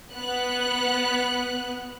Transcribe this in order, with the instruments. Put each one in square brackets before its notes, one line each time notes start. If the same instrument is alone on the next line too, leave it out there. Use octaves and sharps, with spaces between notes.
[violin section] B3 F#6